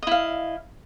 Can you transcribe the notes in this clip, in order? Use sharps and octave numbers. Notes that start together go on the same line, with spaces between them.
E4 D#5 F5